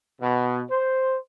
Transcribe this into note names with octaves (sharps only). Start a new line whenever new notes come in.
B2
C5